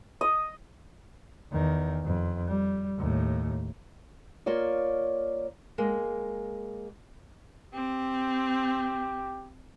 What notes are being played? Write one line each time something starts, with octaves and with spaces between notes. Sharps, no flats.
D#5
E2 D#3
F2
G3
D#2 A2
A#3 F4 C#5 D5
G#3 A#3
C4 G4